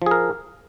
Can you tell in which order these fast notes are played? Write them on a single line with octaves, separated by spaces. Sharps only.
F3 G#4 A#4